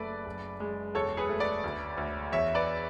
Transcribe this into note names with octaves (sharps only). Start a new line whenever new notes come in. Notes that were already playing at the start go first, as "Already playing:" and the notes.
Already playing: F#1 A3 B4 D5
F#1
G#3
E1 A4 C#5
G#4 B4
A3
B4 D5
D2
D2
E2 C#5 E5
B4 D5